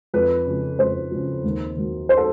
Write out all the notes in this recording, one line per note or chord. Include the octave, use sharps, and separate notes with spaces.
F2 B4
C#3 F3
F2 C5
C#3 F3
D#2
D#3 F#3
C5
A4